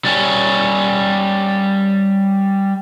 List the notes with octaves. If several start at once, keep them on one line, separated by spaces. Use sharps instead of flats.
G3 C#4